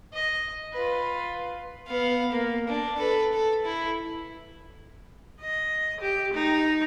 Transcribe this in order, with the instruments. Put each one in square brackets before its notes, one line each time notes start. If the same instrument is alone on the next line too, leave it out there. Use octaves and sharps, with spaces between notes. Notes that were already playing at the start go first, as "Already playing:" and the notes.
[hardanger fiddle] D#5
F4 B4
B3 F5
A#3
D4
A4 B4
A4
E4
[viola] D#5
G4
D#4